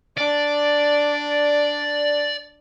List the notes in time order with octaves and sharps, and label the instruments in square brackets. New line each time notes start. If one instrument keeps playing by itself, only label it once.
[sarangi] D4 [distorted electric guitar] D5